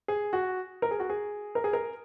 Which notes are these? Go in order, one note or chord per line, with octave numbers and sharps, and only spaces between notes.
G#4
F#4
A#4
G#4
F#4
G#4
A#4
G#4
A#4